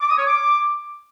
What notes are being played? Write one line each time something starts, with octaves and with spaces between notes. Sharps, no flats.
D6
D#6
C#5
D6